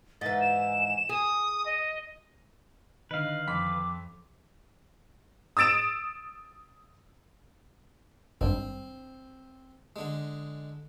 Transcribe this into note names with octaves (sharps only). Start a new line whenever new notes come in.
G#2 E3 A6
E7
G#4 D#6
D#5
D3 D#3 B4 D#5 F5
F2 B5 D6 B6
D#6 E6 A6 D7 E7
G#1 G2 C4
D3 G#3